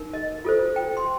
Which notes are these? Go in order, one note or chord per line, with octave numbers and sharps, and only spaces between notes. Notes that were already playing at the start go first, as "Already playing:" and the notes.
Already playing: D#4 A#4
D#5
F4 A4 C5
G5
C6